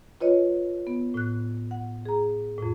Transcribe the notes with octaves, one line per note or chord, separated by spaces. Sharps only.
F4 B4 C#5 D#5
B3
A2 F#6
F#5
G#4 A#5
F2 A2